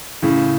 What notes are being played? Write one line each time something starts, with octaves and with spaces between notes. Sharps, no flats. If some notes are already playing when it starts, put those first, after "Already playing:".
A2 C#3